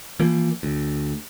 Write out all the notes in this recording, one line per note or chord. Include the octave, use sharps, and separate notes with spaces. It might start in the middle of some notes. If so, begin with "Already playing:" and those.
E3 F3 A#3
D2